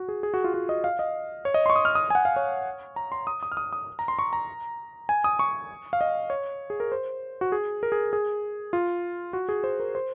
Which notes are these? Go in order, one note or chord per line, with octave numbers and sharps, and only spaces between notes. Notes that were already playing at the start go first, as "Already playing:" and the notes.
Already playing: F#4
G#4
G#4
F#4
F4
F#4
D#5
F5
D#5
C#5
D#5
C6 C#6
D#6
F6
D#6
G#5
F#5
F5
C#5
A#5
C6
D#6
D#6
F6
D#6
D#6
A#5
C6
C#6
A#5
G#5
D#6
C#6
F5
D#5
C#5
G#4
A#4
C5
F#4
G#4
A#4
G#4
G#4
F4
F#4
G#4
C5
A#4
C5